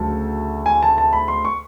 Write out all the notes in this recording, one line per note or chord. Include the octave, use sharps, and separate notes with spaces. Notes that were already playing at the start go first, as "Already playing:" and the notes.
Already playing: D2 C#3 F#3 A3 A5
G#5
A5
A5
B5
C6
C#6